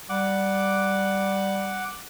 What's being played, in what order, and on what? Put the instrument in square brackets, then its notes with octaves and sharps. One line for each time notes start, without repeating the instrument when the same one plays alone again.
[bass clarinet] G3 [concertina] F#5 D6